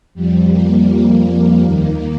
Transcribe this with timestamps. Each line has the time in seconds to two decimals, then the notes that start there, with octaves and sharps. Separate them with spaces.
0.14 F2 F3 G3
0.51 A#3
1.25 G3
1.62 D#2 D#3 A#3